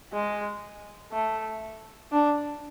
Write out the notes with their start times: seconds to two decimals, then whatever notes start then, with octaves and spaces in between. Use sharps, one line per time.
0.13 G#3
1.12 A3
2.12 D4